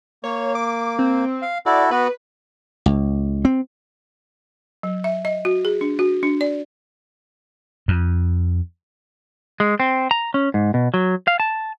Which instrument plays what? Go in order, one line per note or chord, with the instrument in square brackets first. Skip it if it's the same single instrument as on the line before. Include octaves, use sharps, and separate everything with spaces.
[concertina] A#3 [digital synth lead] C#5
[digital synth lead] D6
C4
[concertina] F5
[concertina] E4 F#4 A4 [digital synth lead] D5
[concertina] B3 F#4 [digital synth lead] B4
[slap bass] C#2
C4
[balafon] F#3
E5
D#5
F#4
G#4
D4
F#4
D4
D5
[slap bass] F2
[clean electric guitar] G#3
C4
A#5
C#4
G#2
B2
F#3
F5
A5